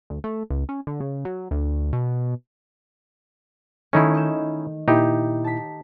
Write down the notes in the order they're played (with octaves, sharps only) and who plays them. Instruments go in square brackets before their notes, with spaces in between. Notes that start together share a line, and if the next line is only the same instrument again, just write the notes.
[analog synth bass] D2
A3
C#2
C#4
D3
C#3
F#3
D2
B2
[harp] D#3 A3 D#5 [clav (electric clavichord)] C#4 D#4 E4
[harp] D#5 G6 E7
[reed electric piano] A#2 E4 [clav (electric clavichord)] D#4 G4
[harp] A5 B6